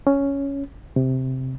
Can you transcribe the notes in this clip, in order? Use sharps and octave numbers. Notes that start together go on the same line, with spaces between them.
C#4
C3